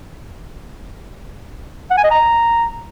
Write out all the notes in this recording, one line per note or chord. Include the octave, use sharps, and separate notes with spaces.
F#5
G#5
D#5
A#5